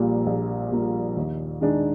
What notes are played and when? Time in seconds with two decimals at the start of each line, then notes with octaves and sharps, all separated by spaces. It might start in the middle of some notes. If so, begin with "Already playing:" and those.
Already playing: A#1 A#2 G3 A#3
0.26 A#1
0.71 A#2 G3 A#3
1.16 D#2
1.61 D#3 G#3 D4